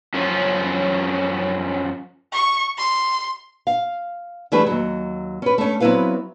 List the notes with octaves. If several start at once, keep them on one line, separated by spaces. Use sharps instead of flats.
F#2 F3 C#4
C#6
C6
F5
E3 G3 A3 G#4 B4
D#2 F#3
C#4 B4
A3 C#4
F#3 B3 C4 E4 B4 F5